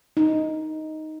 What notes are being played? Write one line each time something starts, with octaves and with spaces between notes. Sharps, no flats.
D#4